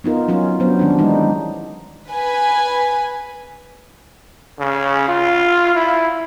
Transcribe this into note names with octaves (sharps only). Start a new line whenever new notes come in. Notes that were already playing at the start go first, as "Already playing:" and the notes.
B3 D#4 F4 A#4
F#3 C#4 D#4 F4
F#3 B3 D4 C5
D#3 G3 C#4 D4
E3 G#3 D#4 E4
B4 G#5
C#3
F4
E4